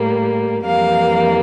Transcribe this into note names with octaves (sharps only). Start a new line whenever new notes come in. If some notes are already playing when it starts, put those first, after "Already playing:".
Already playing: A2 G3 A#3
F2 E3 G3 A#3 F5